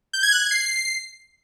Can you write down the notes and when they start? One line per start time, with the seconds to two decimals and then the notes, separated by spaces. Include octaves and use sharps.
0.13 G6
0.23 G#6
0.32 F#6
0.42 G#6
0.51 C7